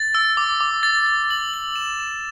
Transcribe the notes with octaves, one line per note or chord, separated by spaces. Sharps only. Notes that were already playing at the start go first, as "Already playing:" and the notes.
Already playing: A6
E6
D6
D6
A6
A6
F#7
F#7
E7
E7